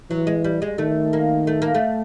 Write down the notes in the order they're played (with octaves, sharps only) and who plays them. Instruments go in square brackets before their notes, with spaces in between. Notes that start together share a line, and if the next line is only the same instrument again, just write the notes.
[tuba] E3 [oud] F#3
[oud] G#3
G3
G#3
[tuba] D#3 [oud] A3
[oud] A#3
A3
A#3
A3